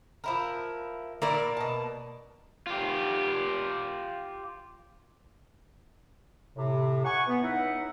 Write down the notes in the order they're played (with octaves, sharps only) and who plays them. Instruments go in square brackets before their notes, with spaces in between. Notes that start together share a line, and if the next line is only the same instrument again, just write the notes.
[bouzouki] F3 E4 A#4
[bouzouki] A#2 E4 [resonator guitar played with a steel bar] A#3 A#4 D5
[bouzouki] B2 A5
[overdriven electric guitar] F4 G4
[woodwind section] A2 C3
F#5 G#5 C#6
B3
C#2 D#4 E4 E5 F#5